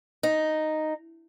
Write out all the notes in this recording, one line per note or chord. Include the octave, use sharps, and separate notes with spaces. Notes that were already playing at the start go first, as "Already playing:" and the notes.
D#4